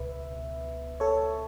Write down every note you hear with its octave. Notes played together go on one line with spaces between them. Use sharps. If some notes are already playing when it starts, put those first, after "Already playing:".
Already playing: C#2 B2 B4 E5
A4 C#5